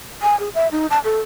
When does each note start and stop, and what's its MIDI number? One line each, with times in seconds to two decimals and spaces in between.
0.22 0.38 80
0.40 0.49 68
0.55 0.68 76
0.72 0.86 63
0.90 0.99 81
1.04 1.19 69